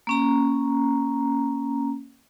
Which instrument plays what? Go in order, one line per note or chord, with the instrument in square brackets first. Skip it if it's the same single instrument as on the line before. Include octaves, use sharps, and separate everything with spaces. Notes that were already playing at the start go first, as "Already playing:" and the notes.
[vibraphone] A#3 C#4 A#5